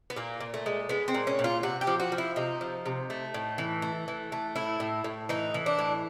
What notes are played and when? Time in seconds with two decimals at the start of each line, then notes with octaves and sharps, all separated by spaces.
0.10 B3
0.16 A#2 A#3
0.40 A#2
0.54 A3
0.66 G#3
0.89 G#3 B3
1.08 C4
1.14 A#2
1.27 C#4
1.39 A#2
1.44 F4
1.63 C3 F#4
1.81 G4
1.87 F3
2.00 F#4
2.12 F3
2.18 E4
2.36 C3 D#4
2.61 F3
2.86 C3
3.10 A3
3.34 A2
3.58 E3
3.82 A3
4.08 E3
4.32 A3
4.56 A2 E4
4.80 A2
5.04 A2
5.29 E3 D#4
5.54 E3
5.66 D4
5.79 A2